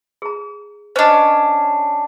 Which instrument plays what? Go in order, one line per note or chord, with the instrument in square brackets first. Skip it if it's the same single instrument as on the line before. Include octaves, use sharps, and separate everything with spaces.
[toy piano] G#4 A#5
[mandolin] C#4 D4 [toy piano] C5 D#5